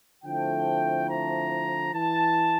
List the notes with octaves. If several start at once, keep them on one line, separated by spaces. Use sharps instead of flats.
D3 F3 A3 C4 E4 G5
A#5
E3 A5